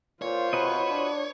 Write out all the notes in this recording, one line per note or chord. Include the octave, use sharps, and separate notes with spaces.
A#2 F4 C5 C#5
C3 F#4 B4 D#5
D4